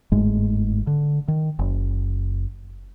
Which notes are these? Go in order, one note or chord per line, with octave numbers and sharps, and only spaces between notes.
G1 G#2 G#3 A3
D3
D#3
F#1